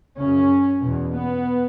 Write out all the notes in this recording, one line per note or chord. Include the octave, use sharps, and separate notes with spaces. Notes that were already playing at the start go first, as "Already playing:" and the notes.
F#2 C#3 C#4
E2 B2
B3